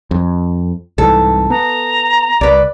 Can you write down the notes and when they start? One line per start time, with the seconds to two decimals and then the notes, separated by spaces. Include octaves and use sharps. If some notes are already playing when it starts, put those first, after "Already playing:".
0.11 F2
0.98 C2 G#2 E3 A4
1.50 B3 A#5
2.41 C2 B4 D5